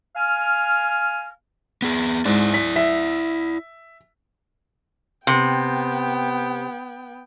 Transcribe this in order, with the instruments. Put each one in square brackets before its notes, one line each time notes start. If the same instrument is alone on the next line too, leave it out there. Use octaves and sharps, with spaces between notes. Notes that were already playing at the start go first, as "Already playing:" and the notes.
[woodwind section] F5 G#5 F6
[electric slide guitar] B3 G#4
[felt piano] G#2 [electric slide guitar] E4 D5
[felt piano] B6
E5
[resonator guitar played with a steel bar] C3 [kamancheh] B3 G5